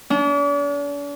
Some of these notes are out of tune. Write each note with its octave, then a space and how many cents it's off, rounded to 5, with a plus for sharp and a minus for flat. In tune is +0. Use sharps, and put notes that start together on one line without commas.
D4 -45